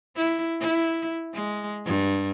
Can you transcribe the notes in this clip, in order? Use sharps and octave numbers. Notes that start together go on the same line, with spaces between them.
E4
E4
G#3
G2